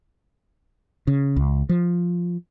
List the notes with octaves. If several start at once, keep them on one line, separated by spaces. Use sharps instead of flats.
C#3
C#2
F3